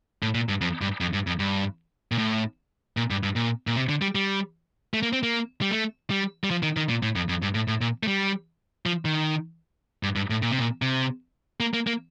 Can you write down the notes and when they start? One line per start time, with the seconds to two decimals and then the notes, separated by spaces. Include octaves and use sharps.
0.23 A2
0.35 A#2
0.49 G2
0.61 F2
0.81 G2
1.01 F2
1.13 G2
1.27 F2
1.39 G2
2.12 A#2
2.18 A2
2.97 A#2
3.10 G2
3.23 G2
3.36 A#2
3.67 A#2
3.76 C3
3.89 D3
4.02 G3
4.15 G3
4.94 A3
5.02 A#3
5.13 C4
5.23 A#3
5.62 G3
5.71 A3
6.10 G3
6.44 G3
6.51 F3
6.63 D#3
6.77 D#3
6.89 A#2
7.03 A2
7.16 F2
7.29 F2
7.42 G2
7.54 A2
7.68 A2
7.81 A#2
8.03 A3
8.07 G3
8.86 F3
9.05 D#3
10.03 G2
10.16 G2
10.30 A2
10.42 A#2
10.51 C3
10.59 A#2
10.82 C3
11.60 A#3
11.74 A#3
11.87 A#3